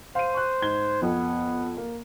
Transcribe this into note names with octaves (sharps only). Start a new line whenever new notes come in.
C5 F5 D#7
C#6 F#6
G#2 G#6 G7
F2 B3
A#3